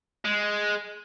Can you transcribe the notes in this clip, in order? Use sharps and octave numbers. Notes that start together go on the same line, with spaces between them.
G#3